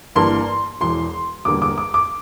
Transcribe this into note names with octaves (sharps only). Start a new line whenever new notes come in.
G1 G2 E3 A#3 D4 C6
E1 E2 E3 C6
E1 E2 D3 G3 A#3 D6
D6
D6
D6